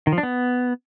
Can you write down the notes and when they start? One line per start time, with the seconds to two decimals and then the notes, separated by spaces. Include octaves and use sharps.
0.07 D#3
0.12 F3
0.18 D4
0.23 B3